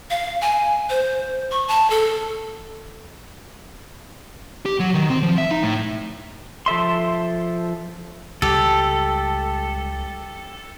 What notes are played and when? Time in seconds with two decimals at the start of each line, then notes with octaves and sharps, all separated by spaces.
0.10 F5
0.41 G#5
0.90 C5
1.52 C#6
1.68 A5
1.90 A4
4.66 G4
4.80 F#3
4.94 D#3
5.10 C4
5.23 F3
5.38 E5
5.51 D#4
5.63 A2
6.66 F3 A4 E5 C6
8.42 C#2 G3 G4 A4